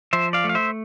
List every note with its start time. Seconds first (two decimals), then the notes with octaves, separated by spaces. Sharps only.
0.13 F3 C5 E5
0.33 D5 F5
0.44 A3
0.49 F5
0.55 C5 E5